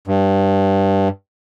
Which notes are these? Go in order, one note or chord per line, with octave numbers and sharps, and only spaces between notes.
G2